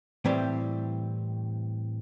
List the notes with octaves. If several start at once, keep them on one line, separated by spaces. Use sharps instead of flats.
A2 E3 G3 C4